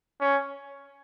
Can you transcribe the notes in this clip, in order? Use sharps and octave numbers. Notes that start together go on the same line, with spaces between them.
C#4